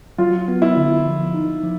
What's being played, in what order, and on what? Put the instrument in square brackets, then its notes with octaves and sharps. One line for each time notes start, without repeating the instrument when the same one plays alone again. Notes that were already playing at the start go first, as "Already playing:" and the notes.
[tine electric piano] F#3 [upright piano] F4
[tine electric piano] B3
[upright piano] E4
[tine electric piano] D3
F3
D#4
F3